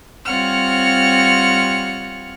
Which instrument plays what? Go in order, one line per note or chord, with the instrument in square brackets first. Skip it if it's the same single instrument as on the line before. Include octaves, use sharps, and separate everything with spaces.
[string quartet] G3 C4 F4 C#5 F#5 F6